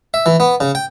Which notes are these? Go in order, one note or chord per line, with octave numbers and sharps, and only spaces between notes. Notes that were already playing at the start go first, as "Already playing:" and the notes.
E5
E3
B3
C#3
G5